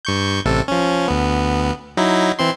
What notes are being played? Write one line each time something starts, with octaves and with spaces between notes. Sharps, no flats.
G2 C#6 G6
A1 C3 A4
F3 C#4
D2 B3
F#3 D#4 E4
E3 C4 C6